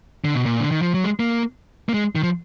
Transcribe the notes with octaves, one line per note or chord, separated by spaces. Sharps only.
D3
B2
A#2
D3
D#3
F3
F#3
G#3
A#3
A#3
G#3
D#3
F3